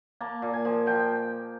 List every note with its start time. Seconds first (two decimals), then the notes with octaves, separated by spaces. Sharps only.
0.21 A#3 A5
0.42 A#2
0.54 G#5
0.65 F3
0.86 F3 G5